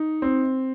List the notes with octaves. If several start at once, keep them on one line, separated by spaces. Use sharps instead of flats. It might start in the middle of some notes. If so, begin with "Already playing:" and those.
Already playing: D#4
C4